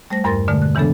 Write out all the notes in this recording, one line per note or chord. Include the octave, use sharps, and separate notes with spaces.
G3 A3 C5 A#6
E2 G2 A#4 C6 A6 A#6
B2 D3 G#3 A3
F#6
C#3 E3 G#3 B3 D4 A4